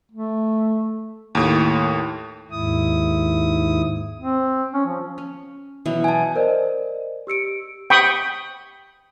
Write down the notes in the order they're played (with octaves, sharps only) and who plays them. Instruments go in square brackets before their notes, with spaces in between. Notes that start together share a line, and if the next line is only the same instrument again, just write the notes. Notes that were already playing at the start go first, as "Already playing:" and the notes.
[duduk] A3
[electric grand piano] D#2 A2
[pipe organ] D#2 G#2 E4 D#6
[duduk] C4
C#4
F3
[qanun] C#4
B2 E3 F#3
[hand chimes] G#5 A5
[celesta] A#4 C5 D5 D#5
G4 E6 C#7 D7
[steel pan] G5 B5 C#6 D#6